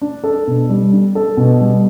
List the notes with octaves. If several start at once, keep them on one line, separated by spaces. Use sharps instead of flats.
D4
A4
B2
G3
D4
A4
B2
G3